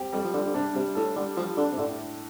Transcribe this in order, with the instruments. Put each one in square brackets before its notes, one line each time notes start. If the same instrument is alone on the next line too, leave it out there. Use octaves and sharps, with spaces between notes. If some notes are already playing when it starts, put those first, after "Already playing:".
Already playing: [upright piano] G3 C4 G4
[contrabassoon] F2 [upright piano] G3
[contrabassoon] F3
[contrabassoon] D3 [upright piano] G3
[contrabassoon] D3
[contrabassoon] C3 [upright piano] D4
[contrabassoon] C3 [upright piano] G3
[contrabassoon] A2 [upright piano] A4
[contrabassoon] D3 [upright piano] G3
[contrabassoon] F3 [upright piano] G3
[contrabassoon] D3 [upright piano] D4
[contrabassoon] C3
[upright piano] A2 [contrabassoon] D3